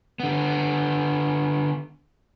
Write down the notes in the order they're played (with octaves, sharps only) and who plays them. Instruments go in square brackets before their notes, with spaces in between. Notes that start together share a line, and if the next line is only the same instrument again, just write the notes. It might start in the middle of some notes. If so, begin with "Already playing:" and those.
[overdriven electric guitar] D3 B3